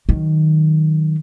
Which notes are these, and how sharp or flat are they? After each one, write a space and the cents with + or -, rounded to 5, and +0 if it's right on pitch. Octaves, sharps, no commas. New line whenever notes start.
D#3 +0 F#3 +0